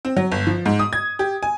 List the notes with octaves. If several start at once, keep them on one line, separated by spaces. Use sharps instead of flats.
C4
F#3
G1
F3
G#2
D#6
G#6
G4
G#5